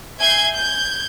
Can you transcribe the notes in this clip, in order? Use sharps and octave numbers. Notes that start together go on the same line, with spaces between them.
E5 G#5 G6 G#6 C7
G6 G#6